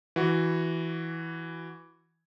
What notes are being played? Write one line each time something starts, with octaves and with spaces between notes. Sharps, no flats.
E3 F#4